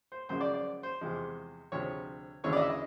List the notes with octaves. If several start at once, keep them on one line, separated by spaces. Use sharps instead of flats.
C5
F#2 C#3 F3 G#3 C5
D5
D5
C5
E2 C3 F3 G#3
D2 C3 F3 G#3 C#5
D2 C#3 E3 G#3 C#5
D5
D#5
E5
D#5